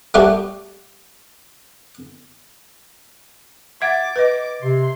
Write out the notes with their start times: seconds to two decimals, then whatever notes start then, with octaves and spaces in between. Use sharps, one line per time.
0.14 G3 A3 B3 F#4 G4
3.82 E5 F#5 D6 G#6 A6
4.16 B4 D#5
4.62 C3 C6